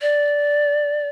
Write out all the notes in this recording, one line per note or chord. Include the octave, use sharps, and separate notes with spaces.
D5